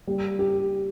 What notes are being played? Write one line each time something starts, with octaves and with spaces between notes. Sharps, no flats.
G3
G4